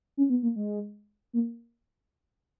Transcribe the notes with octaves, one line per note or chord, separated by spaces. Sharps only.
C#4
B3
A#3
G#3
A#3